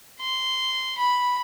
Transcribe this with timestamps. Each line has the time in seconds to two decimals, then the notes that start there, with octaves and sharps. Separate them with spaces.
0.20 C6
0.97 B5